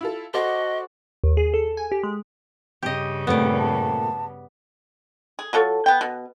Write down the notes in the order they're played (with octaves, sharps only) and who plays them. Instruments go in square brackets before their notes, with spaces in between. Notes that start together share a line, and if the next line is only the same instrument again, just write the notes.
[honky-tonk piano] E4 F4 A4
[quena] F#4 [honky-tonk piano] A4 [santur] C5 D5 F#5 [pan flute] D#5
[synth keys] D#2
G#4
A4
G#5
G4
G#3
[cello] G2 C#3 [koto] G4 D#5
[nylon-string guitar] A#2 A3 C4 [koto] B3 D5
[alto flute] A5
[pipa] G#4
F#3 F4 A4 C#5
B3 G5
B2